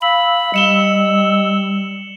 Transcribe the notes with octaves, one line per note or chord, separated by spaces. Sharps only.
F5 B5 E6 F#7
G3 D#5 C#7 E7 G7